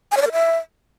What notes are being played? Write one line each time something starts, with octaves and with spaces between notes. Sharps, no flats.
G#5
C#5
D5
A#4
E5